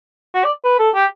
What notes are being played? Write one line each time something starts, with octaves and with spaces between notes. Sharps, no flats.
F#4
D5
B4
A4
G4